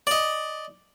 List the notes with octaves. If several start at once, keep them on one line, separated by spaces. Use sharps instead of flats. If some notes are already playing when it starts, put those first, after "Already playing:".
D5 D#5